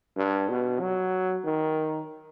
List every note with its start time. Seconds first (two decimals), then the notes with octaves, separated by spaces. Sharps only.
0.17 G2
0.49 B2
0.81 F#3
1.45 D#3